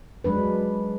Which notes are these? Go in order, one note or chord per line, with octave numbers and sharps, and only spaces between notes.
F#3 G#3 D4 B4